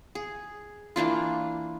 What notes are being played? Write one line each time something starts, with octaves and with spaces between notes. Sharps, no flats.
G#4
E3 A#3 D4 F4